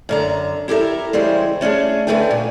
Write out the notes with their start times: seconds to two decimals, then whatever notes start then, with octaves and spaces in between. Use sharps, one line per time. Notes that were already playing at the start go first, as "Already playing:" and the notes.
0.09 F#2 D3 A#5
0.68 E4 G4 A4 A#4 E5
1.13 C#3 E3 G3 G#3 C5
1.61 A3 C#4 D4 G#4
2.07 D3 A3 G#4 B4 G5 G#5
2.31 A#2